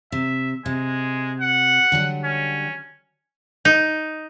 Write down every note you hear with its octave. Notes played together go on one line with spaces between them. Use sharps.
C3 E5
C3 G#3
F#5
D3 F#3 G3
C#4
D#4